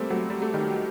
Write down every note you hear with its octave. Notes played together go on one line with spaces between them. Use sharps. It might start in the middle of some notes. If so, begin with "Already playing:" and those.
Already playing: G3 A3 A#3 C4
F#3 A3
G3
A3
D#3 G3